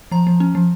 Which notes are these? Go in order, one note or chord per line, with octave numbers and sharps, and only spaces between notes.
F3 A#5
F3
C#4
F3